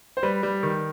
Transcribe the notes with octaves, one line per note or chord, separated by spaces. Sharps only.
C5
G3 B4
G3
D#3